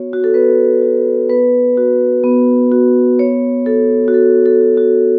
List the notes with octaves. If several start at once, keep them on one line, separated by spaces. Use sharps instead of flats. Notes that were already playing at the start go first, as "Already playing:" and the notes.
Already playing: B3 F#4 C#5
F#4
A4
B3 B4
F#4
B3 B4
F#4
B3
F#4
B3 C#5
F#4 A4
F#4
B3 A4
A4
F#4
F#4